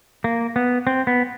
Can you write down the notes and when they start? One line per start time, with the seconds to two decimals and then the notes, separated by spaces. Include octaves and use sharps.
0.24 A#3
0.56 B3
0.87 C4
1.07 B3